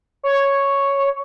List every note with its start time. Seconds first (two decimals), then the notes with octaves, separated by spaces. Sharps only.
0.23 C#5